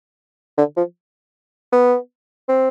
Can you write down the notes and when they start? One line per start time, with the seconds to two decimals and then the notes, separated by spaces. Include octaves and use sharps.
0.58 D3
0.77 F3
1.72 B3
2.49 C4